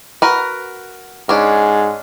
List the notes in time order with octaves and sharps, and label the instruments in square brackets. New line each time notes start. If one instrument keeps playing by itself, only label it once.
[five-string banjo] F#4 A#4 B4
[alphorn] G#2 [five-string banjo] C#4 D4